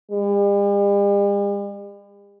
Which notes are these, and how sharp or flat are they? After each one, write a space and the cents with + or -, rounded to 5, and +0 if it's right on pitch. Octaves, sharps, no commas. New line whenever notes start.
G3 +45